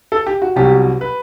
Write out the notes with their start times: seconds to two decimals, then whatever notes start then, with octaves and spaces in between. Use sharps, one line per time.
0.12 A4
0.27 G4
0.42 F#4
0.56 C2 B2 F#3 G4
1.01 B4